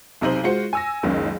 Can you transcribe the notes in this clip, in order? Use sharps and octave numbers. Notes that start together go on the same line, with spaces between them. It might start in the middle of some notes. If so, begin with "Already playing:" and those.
B1 C3 D#4 C5 F#7
G#3 F4 F#4 C5 C#7
G#5 E6 A#6
F#1 C#2 D#3 C#4